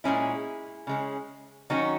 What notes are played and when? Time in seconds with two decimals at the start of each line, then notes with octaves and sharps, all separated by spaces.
0.04 A#2 G#3 C#4 E4 G#4
0.87 C#3 G#3 C#4
1.70 D#3 F#3 C#4 D#4 F#4